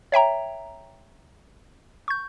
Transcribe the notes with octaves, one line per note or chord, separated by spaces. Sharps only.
C#5 E5 G5 A#5
C#6 G6